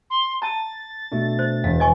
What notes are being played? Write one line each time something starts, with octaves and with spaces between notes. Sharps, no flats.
C6
A5 A#5 A6
B2 A3 D4
C5
E1 F5
D#5 G#5 C#6